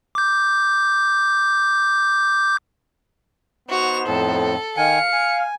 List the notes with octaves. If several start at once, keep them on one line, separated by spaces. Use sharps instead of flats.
D6 G6
B3 D#4 F#4 C5 F7
F2 A2 A4
D#3 F5 G#5 C#7
G#5